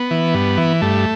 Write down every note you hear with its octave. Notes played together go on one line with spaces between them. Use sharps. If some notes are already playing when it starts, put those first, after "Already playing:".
Already playing: B3
E3
G2
E3
G2 A3